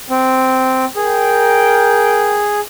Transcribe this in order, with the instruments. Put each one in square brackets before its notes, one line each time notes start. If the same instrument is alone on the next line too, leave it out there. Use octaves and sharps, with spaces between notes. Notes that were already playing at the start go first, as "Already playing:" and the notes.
[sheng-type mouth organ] C4
[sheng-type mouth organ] G#4 [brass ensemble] A#4 G5